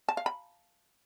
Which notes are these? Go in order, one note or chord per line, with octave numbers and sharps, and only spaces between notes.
A5
F5
B5